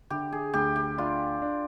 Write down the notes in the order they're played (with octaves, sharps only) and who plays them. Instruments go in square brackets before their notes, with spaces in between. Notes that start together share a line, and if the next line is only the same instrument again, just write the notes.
[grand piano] D3 [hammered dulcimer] G4
[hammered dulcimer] G#4
[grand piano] D2 [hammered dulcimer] G4
[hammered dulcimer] G4
[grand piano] D4 [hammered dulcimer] F4
[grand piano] D4